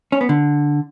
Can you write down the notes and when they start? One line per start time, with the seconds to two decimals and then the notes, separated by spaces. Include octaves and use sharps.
0.12 C#4
0.21 B3
0.29 D3